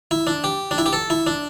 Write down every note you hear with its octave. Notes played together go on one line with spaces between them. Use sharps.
E4
D4
G4
D4
E4
G4
A4
E4
D4